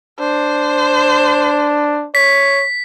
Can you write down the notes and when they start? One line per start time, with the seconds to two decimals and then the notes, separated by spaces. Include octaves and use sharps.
0.20 D4 C5
2.15 C#5 B6